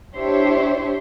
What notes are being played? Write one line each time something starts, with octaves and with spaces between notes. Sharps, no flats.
D4 E4 G4 C5 C#5 E5